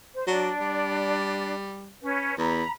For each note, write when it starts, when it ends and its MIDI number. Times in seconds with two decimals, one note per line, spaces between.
0.14 0.26 72
0.27 0.51 54
0.27 1.54 62
0.27 1.54 74
0.60 1.93 55
2.01 2.38 61
2.01 2.38 71
2.38 2.63 40
2.38 2.71 82
2.38 2.71 83